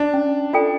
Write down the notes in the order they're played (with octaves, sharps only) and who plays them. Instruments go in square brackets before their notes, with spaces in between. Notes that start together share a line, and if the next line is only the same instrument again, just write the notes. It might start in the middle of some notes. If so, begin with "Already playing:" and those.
Already playing: [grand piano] D4
[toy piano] C#4
F4 A4 D5 G5